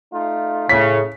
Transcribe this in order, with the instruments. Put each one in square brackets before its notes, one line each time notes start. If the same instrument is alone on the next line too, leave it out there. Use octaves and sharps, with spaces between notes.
[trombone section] A3 D#4 F4
[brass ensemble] A2 [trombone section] C#3 [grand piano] B6